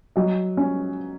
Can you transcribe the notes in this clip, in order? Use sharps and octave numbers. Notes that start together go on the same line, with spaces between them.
F#3 D#5
C#4